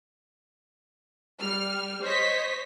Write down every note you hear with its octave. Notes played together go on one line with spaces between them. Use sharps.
G3 F6
C5 C#5 D#5 B6